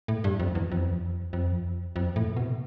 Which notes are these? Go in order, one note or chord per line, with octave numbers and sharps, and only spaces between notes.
A2
G2
F2
E2
F2
F2
F2
A2
B2